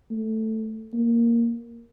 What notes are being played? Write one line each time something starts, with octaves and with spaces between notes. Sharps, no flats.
A3
A#3